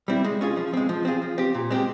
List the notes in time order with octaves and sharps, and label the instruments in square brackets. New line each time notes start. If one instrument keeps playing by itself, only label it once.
[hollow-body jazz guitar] G3 C4 E4
G#3
C#4 F4 G#4
F3
G#3 C4
F3
C4 F4 G#4
F3
C4 G4
A#2
G#3 C4 G4